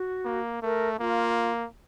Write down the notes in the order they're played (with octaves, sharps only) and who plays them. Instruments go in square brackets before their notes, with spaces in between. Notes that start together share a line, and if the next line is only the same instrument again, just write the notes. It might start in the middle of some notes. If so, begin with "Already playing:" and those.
Already playing: [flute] F#4
[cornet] A#3
[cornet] A3 [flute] A#4
[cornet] A#3 [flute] F4